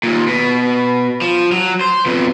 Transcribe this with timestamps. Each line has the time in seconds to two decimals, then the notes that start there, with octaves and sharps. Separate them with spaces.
0.03 D#2 A#2
0.28 B2
1.22 F3
1.52 F#3
1.81 C5
2.06 F2 B2